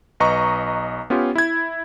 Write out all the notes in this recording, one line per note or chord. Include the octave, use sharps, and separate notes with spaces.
B1 B4 D#5 A#5 C#6
B3 C#4 F4 G4
E4 G#6